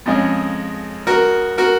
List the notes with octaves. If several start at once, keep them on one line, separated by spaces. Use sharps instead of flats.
F2 C#3 G#3 C#4
F#4 A#4
F#4 A#4